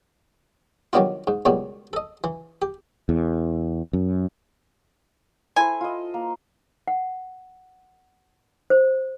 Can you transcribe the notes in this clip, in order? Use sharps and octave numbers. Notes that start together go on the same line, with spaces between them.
D#3 F#3 G3 B3 D4 F4
G#2
C#2 F#2 B2 G3 B3
A4 D#5
E3
G4
E2
F#2
E4 A4 C5 G#5
F4 D#5
A#3
F#5
C5